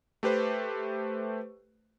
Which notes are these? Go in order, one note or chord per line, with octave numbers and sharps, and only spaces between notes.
A3 G4 B4 C5